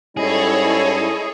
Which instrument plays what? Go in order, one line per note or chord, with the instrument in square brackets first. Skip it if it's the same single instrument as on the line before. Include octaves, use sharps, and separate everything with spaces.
[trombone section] G#2 G3 C#4 [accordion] E4 D#5 [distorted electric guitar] G#4 [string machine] A4 C#5